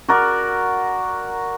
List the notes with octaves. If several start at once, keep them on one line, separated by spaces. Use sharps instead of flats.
F#4 A#4 D5